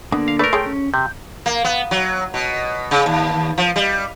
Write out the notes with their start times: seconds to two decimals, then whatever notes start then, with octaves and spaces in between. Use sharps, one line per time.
0.12 D3 A#3 B3 D4
0.28 F5
0.39 A3 A#4 B4 D5
0.53 G#4 A4 C#5 G5 C6
0.66 C#4
0.94 C3 G6
1.46 A#3
1.64 B3
1.91 F#3
2.34 B2
2.91 C#3
3.06 D#2
3.58 F3
3.76 G3